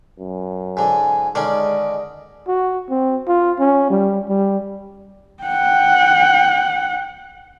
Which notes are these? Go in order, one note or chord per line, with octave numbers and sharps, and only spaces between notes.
F#2
G#2 D3 G#5
D3 D#3 G#3 C#4 D5 D#5
F#4
C4
F4
C#4
G3
G3
F#5 G5